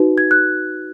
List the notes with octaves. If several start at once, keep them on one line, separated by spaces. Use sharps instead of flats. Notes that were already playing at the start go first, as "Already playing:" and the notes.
Already playing: D#4 F#4 B4
G#6
F#6